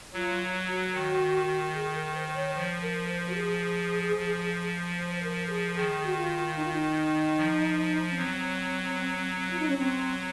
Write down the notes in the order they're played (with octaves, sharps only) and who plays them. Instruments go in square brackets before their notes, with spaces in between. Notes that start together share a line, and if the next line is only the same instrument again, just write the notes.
[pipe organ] F#3 [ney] F4
[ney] F#4
[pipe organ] D#3
[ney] G#4
A#4
C5
C#5
[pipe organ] F3 [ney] C5
[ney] A#4
C5
F#4
G#4
[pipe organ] F3
[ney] C5
C5
A#4
G#4
[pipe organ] D#3 [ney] G#4
[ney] F#4
F4
D#4
F4
D#4
[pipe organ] F3
[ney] C#4
[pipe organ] F#3 [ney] C4
[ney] F4
D#4
C#4
[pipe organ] F#3 [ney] C4